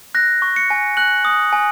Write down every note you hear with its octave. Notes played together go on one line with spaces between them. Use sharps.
F#6 A#6
C#6
C#7
G#5
F#6 F#7
D#6
G#5